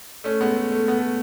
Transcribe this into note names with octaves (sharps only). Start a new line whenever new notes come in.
A3 C#4
G#3 B3
A3
A3
B3
A3